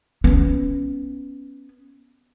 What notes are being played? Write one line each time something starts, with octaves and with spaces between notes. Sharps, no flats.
B3 C#4